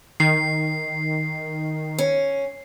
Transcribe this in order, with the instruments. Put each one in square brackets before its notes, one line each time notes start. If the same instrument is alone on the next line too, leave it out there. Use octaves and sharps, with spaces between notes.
[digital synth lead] D#3 [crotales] C7
[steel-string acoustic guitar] C#4